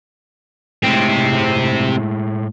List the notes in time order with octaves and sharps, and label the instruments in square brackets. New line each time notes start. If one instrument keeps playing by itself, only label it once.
[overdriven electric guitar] A2 G#3 [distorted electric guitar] C3 C4